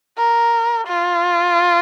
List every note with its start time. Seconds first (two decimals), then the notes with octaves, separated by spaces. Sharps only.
0.17 A#4
0.88 F4